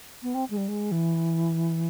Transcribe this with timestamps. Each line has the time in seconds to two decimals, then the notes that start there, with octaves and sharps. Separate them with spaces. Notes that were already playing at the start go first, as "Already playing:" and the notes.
0.23 B3
0.34 C4
0.50 G#3
0.57 G3
0.68 G#3
0.91 E3